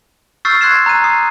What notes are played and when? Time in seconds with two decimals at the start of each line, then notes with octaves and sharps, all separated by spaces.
0.45 C#6 E6 F6 G6 A6 C7
0.61 C6 F#6 G#6 C7 E7
0.86 A#5 F#6 D#7
1.04 D#6 C7